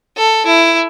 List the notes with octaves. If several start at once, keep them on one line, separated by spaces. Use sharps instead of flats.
A4
E4